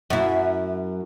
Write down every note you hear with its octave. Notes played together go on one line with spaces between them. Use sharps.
F#2 E4